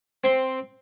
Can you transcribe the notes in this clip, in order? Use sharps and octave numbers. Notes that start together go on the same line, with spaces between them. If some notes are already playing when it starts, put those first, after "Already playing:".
C4 C6